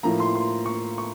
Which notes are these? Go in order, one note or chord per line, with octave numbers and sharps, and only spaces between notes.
A2 F3 A#3 A#5
C6
C6
C#6
C#6